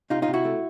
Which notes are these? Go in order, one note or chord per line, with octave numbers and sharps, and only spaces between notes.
C3 D#4 F4
D#4 F4
C3
E4 F#4
A3